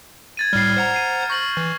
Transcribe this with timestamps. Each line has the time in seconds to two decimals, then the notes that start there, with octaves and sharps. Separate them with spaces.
0.37 G#6 A6 D#7
0.53 A2 G3 F6 C7
0.77 C5 F#5 A#5
0.94 C7 D#7
1.30 C#6 G6 A6 A#6 F#7
1.57 E3